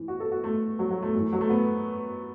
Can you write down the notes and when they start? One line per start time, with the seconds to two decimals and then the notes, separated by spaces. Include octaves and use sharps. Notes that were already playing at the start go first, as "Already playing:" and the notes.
Already playing: A2 E3
0.08 F#4
0.20 A4
0.32 F#4
0.44 A3
0.79 F#3
0.91 F#3
1.03 A3
1.14 F#2 E3
1.33 F#3
1.41 A3
1.50 B3